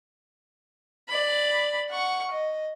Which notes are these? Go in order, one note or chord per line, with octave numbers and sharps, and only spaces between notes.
D5 B5
F#5 C#6
D#5